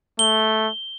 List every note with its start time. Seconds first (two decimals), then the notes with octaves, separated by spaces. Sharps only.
0.19 A3 G7